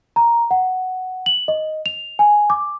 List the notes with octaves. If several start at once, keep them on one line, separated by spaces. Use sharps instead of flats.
A#5
F#5
F#7
D#5
F7
G#5
D6